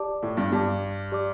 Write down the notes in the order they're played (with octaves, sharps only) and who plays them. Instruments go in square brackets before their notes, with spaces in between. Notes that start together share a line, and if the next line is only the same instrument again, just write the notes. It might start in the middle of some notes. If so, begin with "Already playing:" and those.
Already playing: [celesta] G4 D5 A5 D6
[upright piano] A2
G2
[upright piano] G2 [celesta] G4 D5 A5 D6
[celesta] G4 D5 A5 D6